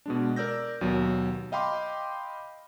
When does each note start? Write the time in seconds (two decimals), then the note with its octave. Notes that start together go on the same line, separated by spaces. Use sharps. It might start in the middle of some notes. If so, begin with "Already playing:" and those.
0.06 B2 G#3 D4
0.36 A#4 D5 E6 G6 A#6
0.81 D#2 B2 F#3
1.52 D#5 F5 G5 B5 C6 D6